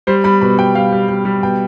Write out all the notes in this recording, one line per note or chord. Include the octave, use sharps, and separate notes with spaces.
G3 C5
G3 B5
B2 B5
G3 G5
G3 F5
G3
G3
G3
B2 G5